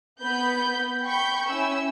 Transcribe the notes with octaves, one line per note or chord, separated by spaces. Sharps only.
B3 B5 G6
G5 B5 C#6 G6
C#4 E4 E6